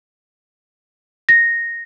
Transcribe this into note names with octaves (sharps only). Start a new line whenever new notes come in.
A#6